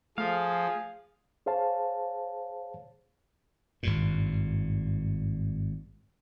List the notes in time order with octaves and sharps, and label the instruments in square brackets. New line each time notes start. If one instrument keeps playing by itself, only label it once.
[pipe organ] F3 [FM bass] A3 [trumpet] G#4 [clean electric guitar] F5
[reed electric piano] G#4 C5 C#5 F5 A5
[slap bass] G#1 G2 A#2